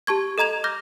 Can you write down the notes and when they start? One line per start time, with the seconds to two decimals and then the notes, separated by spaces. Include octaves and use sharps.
0.07 G4 A5 C#6 G#6
0.38 A4 D#5 A#5 G#6 F7
0.64 D6 F6 G6 A#6